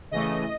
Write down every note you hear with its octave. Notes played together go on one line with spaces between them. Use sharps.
C#3 E3 A3 D#5